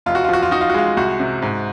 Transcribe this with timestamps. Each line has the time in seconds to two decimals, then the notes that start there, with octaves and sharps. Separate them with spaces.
0.06 F1 F4
0.15 F#4
0.24 F4
0.29 F3 F#4
0.43 F4
0.51 D#4 F#4
0.61 F4
0.70 F#4
0.74 G#3 F4
0.97 C2 F#4
1.20 C3
1.42 G#2